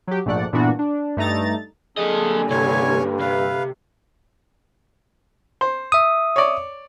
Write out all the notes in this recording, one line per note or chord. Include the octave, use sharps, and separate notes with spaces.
F#3 G4
A#1 G#2 A3 D5 F#5
G2 A#2 E3 B3 D4 F#4
D4
G2 A3 D#4 A#5 A6
D3 G3 A#3 G#4 A4 D#5
C2 G2 C#5 G#5
C3 B4 F5
C5
E5 D#6
C#5 D5